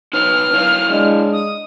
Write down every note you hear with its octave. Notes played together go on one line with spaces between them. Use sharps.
D#4 B4 C#5 F6
E4 C#5 F5
G#3 D4 D#5
D#6